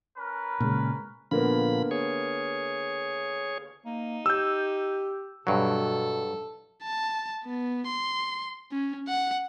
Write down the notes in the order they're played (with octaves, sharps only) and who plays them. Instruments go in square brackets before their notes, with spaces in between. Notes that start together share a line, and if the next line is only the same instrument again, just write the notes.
[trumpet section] C#4 A#4 B4
[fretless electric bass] A#2 C#3 G#3
[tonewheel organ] A#2 F3 B5 [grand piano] D3 A#3 B3
[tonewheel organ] G#4 C#5
[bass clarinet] A#3 [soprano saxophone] D#4
[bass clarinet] G4 [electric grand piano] E6 G6
[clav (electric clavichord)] G2 F#3 [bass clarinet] B2 [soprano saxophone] A4
[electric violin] A5
B3
C6
C#4
F#5